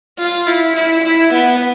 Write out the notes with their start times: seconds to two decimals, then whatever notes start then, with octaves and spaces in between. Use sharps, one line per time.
0.18 F4
0.47 E4
0.77 E4
1.05 E4
1.34 B3